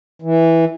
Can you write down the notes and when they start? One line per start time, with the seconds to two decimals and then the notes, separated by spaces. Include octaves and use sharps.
0.22 E3